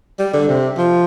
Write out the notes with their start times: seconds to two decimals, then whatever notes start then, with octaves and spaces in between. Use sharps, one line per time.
0.19 G3
0.33 D3
0.49 C3
0.78 F3